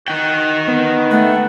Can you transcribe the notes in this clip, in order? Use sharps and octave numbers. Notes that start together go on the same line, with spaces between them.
D#4 F#4 G5
B3
A3 F#5